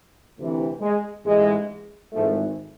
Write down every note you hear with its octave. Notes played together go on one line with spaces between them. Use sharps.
D2 C3 E3
G#3
A1 G#2 E3 G#3
G#1 G#2 E3 F3 A3